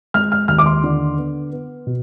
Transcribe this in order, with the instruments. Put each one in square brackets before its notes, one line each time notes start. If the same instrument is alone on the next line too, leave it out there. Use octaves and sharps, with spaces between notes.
[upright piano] G#3 F6
F6
D#2 F6
D6
C6
D3
B3
B3
B2